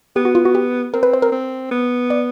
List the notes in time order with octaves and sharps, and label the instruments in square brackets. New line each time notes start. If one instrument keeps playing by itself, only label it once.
[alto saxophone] B3 [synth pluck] G4
[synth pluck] F#4
F4
F#4
G4
[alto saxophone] C4 [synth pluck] A#4
[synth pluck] B4
C5
A#4
[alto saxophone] C4
B3
[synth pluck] D5